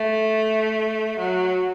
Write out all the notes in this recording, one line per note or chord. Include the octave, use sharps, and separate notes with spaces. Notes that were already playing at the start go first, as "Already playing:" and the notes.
Already playing: A3
F#3